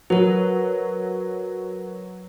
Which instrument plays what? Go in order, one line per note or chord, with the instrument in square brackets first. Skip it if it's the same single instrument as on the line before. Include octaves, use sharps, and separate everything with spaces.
[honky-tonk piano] F#3 [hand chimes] A#4 B4